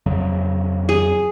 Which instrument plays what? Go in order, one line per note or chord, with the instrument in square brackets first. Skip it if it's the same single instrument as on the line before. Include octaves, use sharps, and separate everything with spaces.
[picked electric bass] F2 C#3 F#3
[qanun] G#4